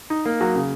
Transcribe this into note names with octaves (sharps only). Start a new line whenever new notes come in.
D#4
A#3
F#3
C#3